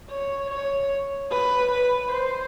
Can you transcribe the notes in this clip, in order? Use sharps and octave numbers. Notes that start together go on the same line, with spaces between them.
C#5
C#5
B4
B4
C5